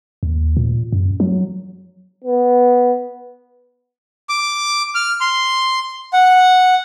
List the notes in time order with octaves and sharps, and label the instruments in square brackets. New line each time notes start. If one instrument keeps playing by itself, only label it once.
[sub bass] D#2
A#2
F#2
F#3
[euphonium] B3
[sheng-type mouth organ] D6
F6
C6
F#5